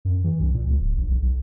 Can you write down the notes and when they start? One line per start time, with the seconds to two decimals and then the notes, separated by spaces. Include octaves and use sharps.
0.05 F#2
0.24 E3
0.40 C2
0.54 A#2
0.66 C#2
0.80 D1
0.96 A#1
1.08 B1
1.22 B1